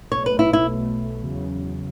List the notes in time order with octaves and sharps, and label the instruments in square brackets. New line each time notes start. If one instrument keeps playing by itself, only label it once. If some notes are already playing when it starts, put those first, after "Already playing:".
[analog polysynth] B1 B2 A3 [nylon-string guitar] C#5
[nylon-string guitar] B4
E4
E4
[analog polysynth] B1 B2 A3
E2 C#3 F#3